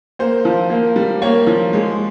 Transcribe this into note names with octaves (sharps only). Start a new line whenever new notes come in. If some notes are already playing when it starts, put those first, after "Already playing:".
A#3 C5
F3
A#3
G3
A#3 C#5
F3
G#3